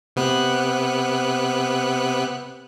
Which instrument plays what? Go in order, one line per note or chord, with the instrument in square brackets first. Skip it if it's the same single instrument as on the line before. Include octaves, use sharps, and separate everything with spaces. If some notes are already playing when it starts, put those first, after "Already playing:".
[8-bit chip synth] C3 B3 F#6